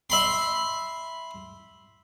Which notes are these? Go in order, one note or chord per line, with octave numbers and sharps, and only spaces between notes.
E5 B5 C6